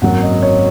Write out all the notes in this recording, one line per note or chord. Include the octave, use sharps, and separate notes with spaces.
G#1 F#2 F#3 A#3 F#5
D#5
C#5